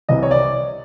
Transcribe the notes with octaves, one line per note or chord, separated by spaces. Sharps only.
C2 C3 E3 G3 D#5
C#5
D5